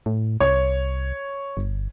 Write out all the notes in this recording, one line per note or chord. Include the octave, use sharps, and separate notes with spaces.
A2
C2 C#5
G1